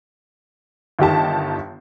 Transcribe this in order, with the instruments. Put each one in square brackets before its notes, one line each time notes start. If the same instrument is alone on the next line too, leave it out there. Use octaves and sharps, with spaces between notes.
[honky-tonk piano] G1 D#3 G4 A5